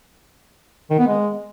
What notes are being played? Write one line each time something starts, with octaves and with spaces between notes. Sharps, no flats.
D#3
B3
G#3